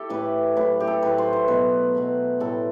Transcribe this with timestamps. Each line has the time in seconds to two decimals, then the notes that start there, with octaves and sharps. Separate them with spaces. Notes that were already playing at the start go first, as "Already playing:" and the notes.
Already playing: E4 G4 A4
0.10 A2 E3 A3 B4
0.56 A2 F#3 A3 B4
0.80 G4
0.87 A4
1.03 A2 F#3 A3 B4
1.18 C5
1.33 B4
1.48 B2 F#3 A3 B4
1.95 B2 F#3 A3
2.40 A2 E3 G3 A4